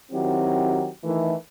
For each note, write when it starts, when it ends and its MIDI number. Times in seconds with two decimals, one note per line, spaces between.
0.12 0.88 51
0.12 0.88 54
0.12 0.88 60
0.12 0.88 64
0.12 0.88 66
0.12 0.88 67
1.04 1.34 51
1.04 1.34 52
1.04 1.34 57